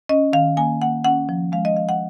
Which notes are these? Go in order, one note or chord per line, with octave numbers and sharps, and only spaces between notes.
C#4 D#5
D#3 F5
A#3 G#5
A#3 F#5
C#4 F#5
F3
G#3 F5
D#5
F3 F5
F#5